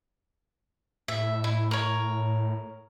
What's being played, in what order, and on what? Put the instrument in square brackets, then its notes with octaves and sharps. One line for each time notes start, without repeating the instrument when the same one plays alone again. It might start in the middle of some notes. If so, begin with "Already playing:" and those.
[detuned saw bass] A2 [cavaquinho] E5
[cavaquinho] E4
A#4 C#5